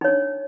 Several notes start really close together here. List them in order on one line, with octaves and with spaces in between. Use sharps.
D#4 C#5 D4